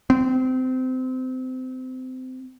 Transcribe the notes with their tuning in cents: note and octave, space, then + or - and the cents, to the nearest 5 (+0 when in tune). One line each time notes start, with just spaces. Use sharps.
C4 -25